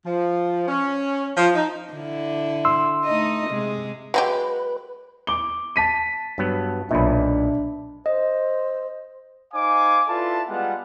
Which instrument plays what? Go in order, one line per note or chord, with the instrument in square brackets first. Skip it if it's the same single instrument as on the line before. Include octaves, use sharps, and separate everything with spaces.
[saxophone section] F3
C#4
F3
D#4
[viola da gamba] D3 E4
[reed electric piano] C6 E6
[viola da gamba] A3 D#4 D#5
C3 G#3
[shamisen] F#3 G#3 G4 [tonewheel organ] B4
[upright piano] D6 G7
A5 B6 D#7
[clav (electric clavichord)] G2 F#3 B3
[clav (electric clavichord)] B1 A#2 [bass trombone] D4 [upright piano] E5 B5
[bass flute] C5 [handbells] D#5
[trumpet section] D#4 C5 F5 G#5 D6
E4 F4 A4 B4 D5 A5
G3 G#3 B3 F4 F#5